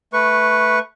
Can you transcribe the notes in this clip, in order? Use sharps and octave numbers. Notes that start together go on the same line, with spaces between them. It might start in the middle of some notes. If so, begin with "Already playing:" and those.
A3 B4 C#6